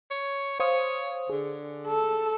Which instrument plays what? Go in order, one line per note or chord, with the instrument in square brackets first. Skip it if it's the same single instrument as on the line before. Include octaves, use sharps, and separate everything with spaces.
[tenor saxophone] C#5
[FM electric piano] C5 F5 D#6 [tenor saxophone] C#5
[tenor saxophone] D3 [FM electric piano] G#4
[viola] A4